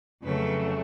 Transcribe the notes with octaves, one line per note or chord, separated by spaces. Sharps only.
F2 C#3 F#3 A3 B4